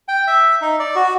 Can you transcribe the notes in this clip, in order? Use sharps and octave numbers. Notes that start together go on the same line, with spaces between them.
G5
E5
D#4
D5
F#4